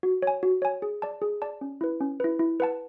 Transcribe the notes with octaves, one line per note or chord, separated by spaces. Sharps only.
F#4
C#5 G#5
F#4
C#5 G#5
G#4
D5 A5
G#4
D5 A5
C#4
E4 B4
C#4
E4 B4
E4
B4 F#5 A5